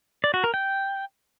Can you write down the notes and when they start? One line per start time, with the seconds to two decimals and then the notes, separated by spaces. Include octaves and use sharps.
0.24 D5
0.34 F#4
0.44 A#4
0.54 G5